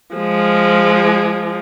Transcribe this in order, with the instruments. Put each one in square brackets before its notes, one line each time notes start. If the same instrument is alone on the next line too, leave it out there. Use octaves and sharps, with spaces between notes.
[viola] F3 G#3